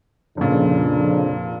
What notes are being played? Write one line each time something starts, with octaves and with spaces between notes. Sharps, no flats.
F1 F2 A#2 C#3 D4